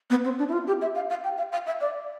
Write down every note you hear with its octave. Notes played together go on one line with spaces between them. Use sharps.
B3
C4
D4
E4
F4
G4
E5
F5
F5
G5
F5
F5
E5
D5